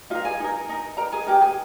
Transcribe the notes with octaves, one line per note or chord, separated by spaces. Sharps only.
D#4 F4 A#4 F5
G#4 G#5
D#4 A#4
D#4 A#4
D#4 A#4 A#5
G#4 G#5
D#4 G4 A#4 A#5
G#4 G#5